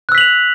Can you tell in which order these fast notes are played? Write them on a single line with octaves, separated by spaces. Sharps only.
F#6 E6 B6 F#7 F7